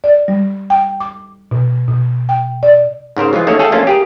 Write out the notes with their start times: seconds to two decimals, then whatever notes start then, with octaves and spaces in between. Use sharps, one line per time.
0.04 D5
0.28 G3
0.70 G5
1.00 D6
1.51 B2
1.88 B2
2.29 G5
2.63 D5
3.17 G#2 C#3 A#4 C5
3.33 E3 F3 G#3 F4 G#4
3.47 D#3 A3 A#3 C#4 A4 C#5
3.59 G#4 A4 E5 F5 G5 A5
3.72 F3 A3 A#3 C#4 D4 F4
3.87 G4 G#4 A#4